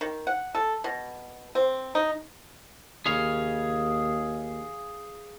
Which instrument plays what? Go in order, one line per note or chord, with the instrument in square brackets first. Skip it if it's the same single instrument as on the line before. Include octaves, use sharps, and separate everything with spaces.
[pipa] D#3
F#5
A4
B2
C4
D#4
[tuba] D#2 [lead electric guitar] G#4 F5